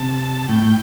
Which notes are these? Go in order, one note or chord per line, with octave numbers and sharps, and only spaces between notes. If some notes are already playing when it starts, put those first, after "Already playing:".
Already playing: C3 A5
A2 G5
A2